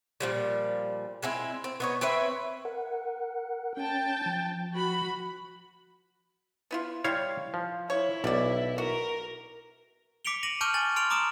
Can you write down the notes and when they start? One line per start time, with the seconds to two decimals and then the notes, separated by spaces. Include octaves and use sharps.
0.20 A#2 F3 G3
1.23 G#3 C4 E4
1.64 C4
1.80 B3 D#4 C#5
2.01 C4 B4 C#5 E5
2.65 A#4 F#5
3.77 C#4 G5 A5
4.26 F3
4.72 F#4 B5
6.71 B3 E4 F4
7.04 G3 E4 F4 C#5 F5
7.54 F3
7.90 E4 C#5
8.24 B1 D4 D5
8.78 F#4 A#4
10.25 D6 B6 C#7 D7 F7 G7
10.43 A#6 D#7 F#7
10.61 A5 C#6 D6 F6 G6 D#7
10.74 G#5 A6 F#7
10.96 C6 F6 D7 F7 F#7
11.10 A#5 D6 D#6 D7 E7